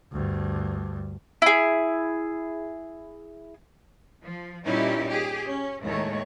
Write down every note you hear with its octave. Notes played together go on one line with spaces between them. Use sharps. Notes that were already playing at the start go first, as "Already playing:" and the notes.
D2 G2
E4 G#4
F3
A#2 G3 C#4 D#4 E4 G4
G4 G#4
C#4
D#2 A2 D#3 G#3 A3 C#5